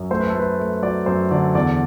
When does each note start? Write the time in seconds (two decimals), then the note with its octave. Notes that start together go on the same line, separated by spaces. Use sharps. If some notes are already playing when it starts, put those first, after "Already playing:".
Already playing: F#2
0.10 A3 C5
0.20 B4
0.29 A4
0.34 A3
0.39 B4
0.59 A3
0.82 F#3 D5
1.06 F#2 C5
1.31 D3 D5
1.55 E2 D5